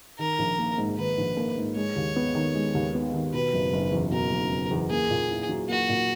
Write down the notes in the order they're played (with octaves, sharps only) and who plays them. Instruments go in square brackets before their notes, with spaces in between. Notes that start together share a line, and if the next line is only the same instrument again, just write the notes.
[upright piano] D#3 [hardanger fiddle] A#4
[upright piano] A#1
A#3
G#2
[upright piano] D#3 [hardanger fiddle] B4
[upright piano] A#1
A#3
G#2
[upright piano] G#3 [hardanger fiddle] C#5
[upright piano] D#2
B3
D#3
G#3
D#2
B3
D#3
[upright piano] B2 [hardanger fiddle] B4
[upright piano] F#1
F#1
E2
[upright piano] B2 [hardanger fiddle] A#4
[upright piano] F#1
F#1
E2
[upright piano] A#3 [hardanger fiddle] G#4
[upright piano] A#2
E4
F#3
[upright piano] A#3 [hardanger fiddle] F#4
[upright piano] A#2